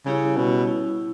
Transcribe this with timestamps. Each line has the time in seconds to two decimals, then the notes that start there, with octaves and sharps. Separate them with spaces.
0.05 C#3 G3 C#4 E4 G4 C#5
0.37 B2
0.67 E4